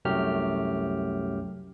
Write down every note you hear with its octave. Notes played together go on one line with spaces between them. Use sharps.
C2 F#2 F#3 A3 G4 F6